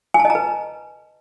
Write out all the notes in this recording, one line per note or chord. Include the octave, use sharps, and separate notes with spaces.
G#5
A5
D#5
A#5
B4